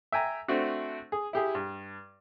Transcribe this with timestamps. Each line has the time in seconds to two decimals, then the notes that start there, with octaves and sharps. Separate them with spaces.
0.12 E5 G5 G#5 A#5
0.48 A3 C4 D4 F#4
1.12 G#4
1.33 E4 G4 G#4
1.55 G2